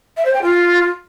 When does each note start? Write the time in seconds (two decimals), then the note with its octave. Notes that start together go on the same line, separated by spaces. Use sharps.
0.17 E5
0.25 C5
0.34 G5
0.42 F4